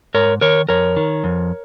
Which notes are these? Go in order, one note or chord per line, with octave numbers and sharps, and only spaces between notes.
G#2 A#4 C#5
D#3 A#4 C#5
F2 A#4 C#5
D#3
F2